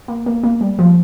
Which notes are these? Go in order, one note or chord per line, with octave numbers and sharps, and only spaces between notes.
A#3
A#3
A#3
G3
F3